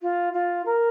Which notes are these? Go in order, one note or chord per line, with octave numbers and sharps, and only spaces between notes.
F4
F4
A#4